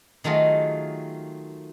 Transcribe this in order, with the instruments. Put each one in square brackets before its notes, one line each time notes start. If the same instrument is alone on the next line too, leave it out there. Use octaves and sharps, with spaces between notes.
[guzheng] D#3 F#3 A3 F4 G#4